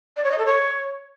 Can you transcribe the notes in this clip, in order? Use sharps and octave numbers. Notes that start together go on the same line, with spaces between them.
D5
C#5
D#5
A4
C#5